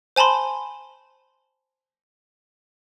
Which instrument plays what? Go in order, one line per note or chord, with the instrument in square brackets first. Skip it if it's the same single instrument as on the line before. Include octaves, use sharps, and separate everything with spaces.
[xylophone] C5 G#5 A5 B5 C6